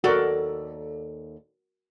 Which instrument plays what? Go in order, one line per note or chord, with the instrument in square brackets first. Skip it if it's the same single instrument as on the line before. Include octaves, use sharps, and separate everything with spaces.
[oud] D#2 A4 D5 [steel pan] F#4 A#4